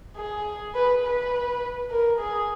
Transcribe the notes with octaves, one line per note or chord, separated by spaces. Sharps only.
G#4
B4
B4
A#4
G#4